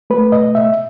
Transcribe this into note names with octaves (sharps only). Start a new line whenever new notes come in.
A3 B4
B2 D#5
B2 E5